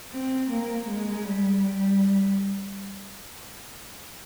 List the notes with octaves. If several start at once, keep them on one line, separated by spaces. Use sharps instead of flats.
C4
A#3
G#3
G3
G3